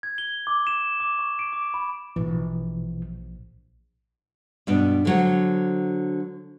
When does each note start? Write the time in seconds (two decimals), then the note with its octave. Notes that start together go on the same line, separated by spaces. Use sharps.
0.03 G#6
0.18 G7
0.47 D6
0.67 E7
1.00 D6
1.19 C#6
1.39 D7
1.53 D6
1.74 B5
2.16 A#1 B2 E3
4.67 G2 B2 D4
5.05 D3 F#3 C5